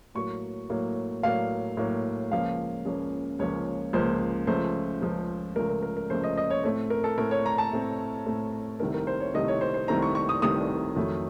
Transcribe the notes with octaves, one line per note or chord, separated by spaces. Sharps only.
A2 F#3 A#3 C#6
A2 F#3 A#3
A2 F#3 A#3 F5
A2 F#3 A#3
C#2 C#3 F3 A#3 C#4 F5
C#2 C#3 F3 A#3 C#4
C#2 C#3 F3 A#3 C#4 C#5
C#2 C#3 F3 A#3 C#4 C5
C#2 C#3 F3 A3 C5
C#2 C#3 F3 A3
C#2 C#3 F3 A3 A#4
A#4
A#4
A#4
C#2 C#3 F3 A3 C5
D#5
D#5
C#5
A2 A3 C4 C#5
A#4
A4
A2 A3 C4 A#4
C#5
A#5
A5
A2 A3 C4
A2 A3 C4
C2 C3 D#3 A3 C4 A#4
A#4
C5
C#5
C2 C3 D#3 A3 C4 D#5
C#5
C5
C5
C2 C3 D#3 A3 C4 A#5
C#6
C#6
D#6
C2 C3 D#3 A3 C4 D#6
F2 D#3 F#3 A3